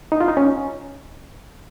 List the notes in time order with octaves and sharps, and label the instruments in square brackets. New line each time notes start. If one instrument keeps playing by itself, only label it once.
[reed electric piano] D#4
F4
D#4
C#4